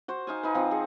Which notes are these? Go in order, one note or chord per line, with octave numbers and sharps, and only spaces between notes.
F#4 C5
D#4 F5 G#5
D#4 B4
F3 C4
G#4 F#5